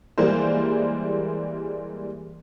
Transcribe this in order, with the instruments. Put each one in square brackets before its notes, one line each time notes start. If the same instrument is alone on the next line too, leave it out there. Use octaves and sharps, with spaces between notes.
[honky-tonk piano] E3 G3 G#3 A#3 A#4 C5